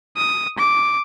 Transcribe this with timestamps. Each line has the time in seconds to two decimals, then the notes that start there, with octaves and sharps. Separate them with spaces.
0.17 D#6
0.58 D6